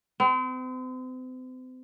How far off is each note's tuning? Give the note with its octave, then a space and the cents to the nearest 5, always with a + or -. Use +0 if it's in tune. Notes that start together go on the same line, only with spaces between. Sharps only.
C4 -40